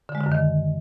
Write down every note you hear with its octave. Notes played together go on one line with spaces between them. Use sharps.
D3
G#3
D3
F#2
D#3